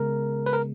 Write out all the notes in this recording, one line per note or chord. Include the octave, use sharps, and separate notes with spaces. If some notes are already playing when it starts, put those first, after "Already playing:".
Already playing: C#3 G#3 B3 A#4
B4
A#4